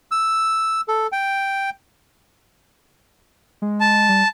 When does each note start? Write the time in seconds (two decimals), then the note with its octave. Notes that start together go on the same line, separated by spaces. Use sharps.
0.11 E6
0.88 A4
1.12 G5
3.62 G#3
3.80 A5
4.09 G3